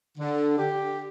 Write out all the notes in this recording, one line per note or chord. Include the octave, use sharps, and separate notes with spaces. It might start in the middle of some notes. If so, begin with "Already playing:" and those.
D3
G4